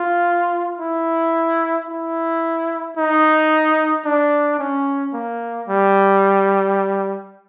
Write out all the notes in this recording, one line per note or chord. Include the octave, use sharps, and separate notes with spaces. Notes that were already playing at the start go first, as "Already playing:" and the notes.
Already playing: F4
E4
E4
D#4
D4
C#4
A#3
G3